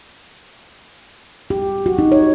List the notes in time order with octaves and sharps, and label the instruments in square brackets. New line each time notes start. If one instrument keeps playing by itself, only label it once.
[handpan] G4
F#4
D#4
C#5